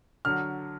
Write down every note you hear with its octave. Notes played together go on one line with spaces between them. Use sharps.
D3 F#3 F6